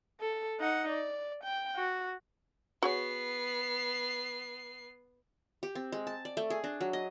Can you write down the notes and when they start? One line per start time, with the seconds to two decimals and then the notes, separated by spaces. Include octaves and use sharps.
0.21 A4
0.60 D#4 F#5
0.90 D5
1.44 G5
1.76 F#4
2.82 B3 F#4 G#4 C#5 C7
5.63 G4
5.75 C4
5.92 G#3
6.07 A5
6.25 D5
6.37 A3
6.50 G#4
6.64 D4
6.81 F#3
6.93 D#5